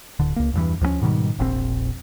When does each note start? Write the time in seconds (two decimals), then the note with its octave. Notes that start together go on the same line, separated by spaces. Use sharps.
0.19 D1 D3
0.36 C#2 A#3
0.54 E2 G2 E3
0.81 D2 F3 F#3 C#4
1.01 G#2 B2 D#3 G3
1.39 E1 A#1 A#2 C4